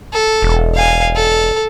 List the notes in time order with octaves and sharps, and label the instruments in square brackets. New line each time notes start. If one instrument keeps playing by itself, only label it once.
[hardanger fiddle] A4
[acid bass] E1
[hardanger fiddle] F5 G#5
A4